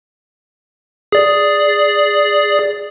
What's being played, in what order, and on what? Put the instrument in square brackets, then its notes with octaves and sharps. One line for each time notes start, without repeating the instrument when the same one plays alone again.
[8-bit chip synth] G#4 D5